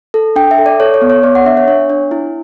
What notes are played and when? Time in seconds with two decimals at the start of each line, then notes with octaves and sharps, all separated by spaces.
0.14 A4
0.36 D4 G5
0.51 E5
0.58 A4
0.66 D5
0.80 A4 C#5
0.94 C#5
1.02 B3
1.10 C#5
1.23 B3 D5
1.35 F#5
1.45 D4 E5
1.57 C#5
1.67 D4 C#5
1.90 D4
2.11 E4